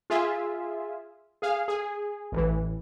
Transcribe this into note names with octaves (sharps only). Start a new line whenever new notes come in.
F4 G#4 E5
G#4 F5
G#4
A1 E3